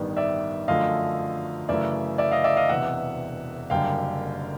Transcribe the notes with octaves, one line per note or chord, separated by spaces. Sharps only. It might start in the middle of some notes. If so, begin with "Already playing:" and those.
Already playing: A1 G2 D#3 G3 B3
D5 E5
F#2 D3 F3 A3 D#5 F5
F#2 C#3 E3 A3 D5 E5
D5 E5
D#5 F5
D5 E5
D#5 F5
E1 E2 C3 E5 F#5
F#1 F#2 D3 G3 F5 G5